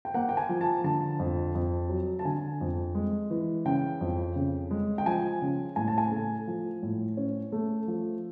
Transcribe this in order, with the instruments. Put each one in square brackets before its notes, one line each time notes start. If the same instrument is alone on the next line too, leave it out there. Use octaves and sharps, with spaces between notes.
[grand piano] G5
A#3 F#5
G5
G#5
F3
A5
D3 A5
F2
F2
F#3
A5
D3 G#5
F2
G#3
E3
C#3 G5
F2
C#3
G#3
G5
F3 G#5
C#3
A2 G#5
A5
G#5
A3
F3
A2
C#4
A3
F3